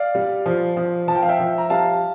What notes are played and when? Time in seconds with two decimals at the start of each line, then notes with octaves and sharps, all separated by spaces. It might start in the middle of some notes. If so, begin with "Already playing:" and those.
Already playing: D5 F5
0.15 G3
0.46 F3
0.77 F3
1.08 F3 A5
1.15 G5
1.23 F5
1.29 E5 G5
1.39 F3
1.58 A#5
1.70 G3 F5 A5